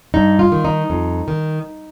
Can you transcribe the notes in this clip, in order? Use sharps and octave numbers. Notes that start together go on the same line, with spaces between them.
G2 D#4
F4
D#3
D#4
F2
D#3